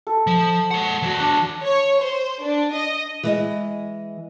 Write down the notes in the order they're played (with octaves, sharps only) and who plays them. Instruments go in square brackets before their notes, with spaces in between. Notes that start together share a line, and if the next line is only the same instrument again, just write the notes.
[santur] A4
[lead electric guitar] F3
[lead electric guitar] G#3 F#5 [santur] C#5
[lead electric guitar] E3 F#4
[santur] D4
[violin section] C#5
C5
D4
D#5
[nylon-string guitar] E3 G#3 D#5